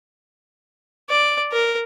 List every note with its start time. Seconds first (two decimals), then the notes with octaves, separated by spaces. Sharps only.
1.10 D5
1.53 A#4